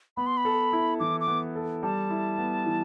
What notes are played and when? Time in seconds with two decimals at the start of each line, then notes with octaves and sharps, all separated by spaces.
0.17 B3 B5
0.27 C6
0.37 B5
0.45 A4
0.73 E4
1.00 E3 D6
1.20 D6
1.27 B3
1.55 A4
1.83 G3 A5
2.10 E4
2.38 B3
2.66 E3